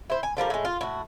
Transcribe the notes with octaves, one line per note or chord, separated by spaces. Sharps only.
E4 C5
G#5
D3 F3 G3 A#4
A2 G#3
F4
A2 F#4